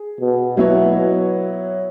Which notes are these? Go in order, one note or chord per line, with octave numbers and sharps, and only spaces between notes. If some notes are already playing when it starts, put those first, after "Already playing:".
Already playing: G#4
B2
B2 F#3 B3 E4 C#5